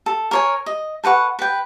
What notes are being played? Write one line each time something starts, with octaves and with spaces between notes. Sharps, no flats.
A4
A#4 C#5 G#5
D#5
A4 B4 F#5 C#6
B4 G5